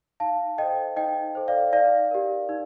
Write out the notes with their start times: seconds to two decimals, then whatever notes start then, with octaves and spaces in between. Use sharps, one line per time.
0.20 D#4 F5 A5
0.58 A4 C5 D#5 G5
0.97 D#4 D#5 G5
1.35 A4 C5
1.48 D5 F5
1.73 D#4 D5 F5
2.11 G4 A#4
2.49 D#4